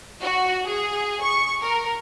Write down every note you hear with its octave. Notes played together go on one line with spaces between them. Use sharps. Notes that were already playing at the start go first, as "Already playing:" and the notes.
F#4
G#4
C#6
A#4